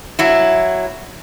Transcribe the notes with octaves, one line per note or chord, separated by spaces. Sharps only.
F#3 E4